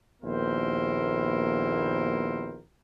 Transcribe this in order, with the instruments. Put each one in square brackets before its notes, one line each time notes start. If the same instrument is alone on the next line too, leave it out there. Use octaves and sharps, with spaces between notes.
[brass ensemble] A#1 D#2 B3 E4 A#4 C5